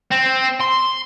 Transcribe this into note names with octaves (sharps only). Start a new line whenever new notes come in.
C4
C6